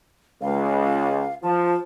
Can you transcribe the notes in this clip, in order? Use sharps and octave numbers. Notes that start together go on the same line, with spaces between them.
C#2 F5
F3 A5